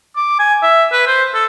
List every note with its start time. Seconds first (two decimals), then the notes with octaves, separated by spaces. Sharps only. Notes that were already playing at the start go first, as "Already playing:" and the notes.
0.16 D6
0.39 G#5
0.62 E5
0.92 B4
1.07 C5
1.34 A4